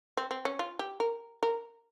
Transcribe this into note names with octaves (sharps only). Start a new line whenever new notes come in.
C4
C4
C#4
F4
G4
A#4
A#4